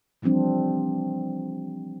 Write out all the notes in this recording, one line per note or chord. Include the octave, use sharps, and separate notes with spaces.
E3 F3 G3 C4 D4